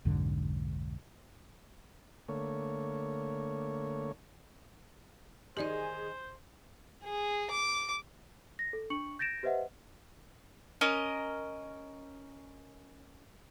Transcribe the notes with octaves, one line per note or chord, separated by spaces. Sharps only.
B1 F2 G#2 D3
D3 A3 A#3 C#5
D#3 D#4 G4 G#4 C5 D5 D#5 G#5
G#4
D6
A#6
A4
D4 C#6 C#7 F#7
G6 A6 A#6 D7 E7
G4 B4 C5 D#5 E5 F#5
C#4 A#4 D#5